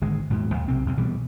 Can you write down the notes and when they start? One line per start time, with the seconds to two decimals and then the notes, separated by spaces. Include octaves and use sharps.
0.01 G#1 D3 G#3
0.30 D#1 G#2 B2
0.54 D#2
0.68 B1 C3 C4
0.86 B1 C3
0.97 B2 E3 G3